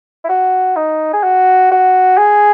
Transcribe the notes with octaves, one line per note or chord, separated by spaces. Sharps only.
E4
F#4
D#4
G#4
F#4
F#4
G#4